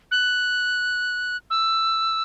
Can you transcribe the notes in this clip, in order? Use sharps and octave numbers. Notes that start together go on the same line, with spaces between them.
F#6
E6